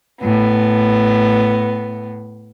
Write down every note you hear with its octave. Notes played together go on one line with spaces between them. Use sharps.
A2 B3